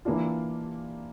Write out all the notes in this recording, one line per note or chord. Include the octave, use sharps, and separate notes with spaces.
E3 A#3 D4 F4